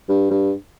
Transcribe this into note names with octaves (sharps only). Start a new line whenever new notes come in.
G2
G2